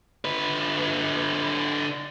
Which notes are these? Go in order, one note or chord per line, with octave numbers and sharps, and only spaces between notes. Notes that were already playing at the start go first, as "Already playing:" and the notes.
D3 B4